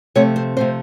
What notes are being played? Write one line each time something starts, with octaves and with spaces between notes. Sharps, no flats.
C3 F3 A3 C4 C#5
C5
C3 F3 A3 C4 C5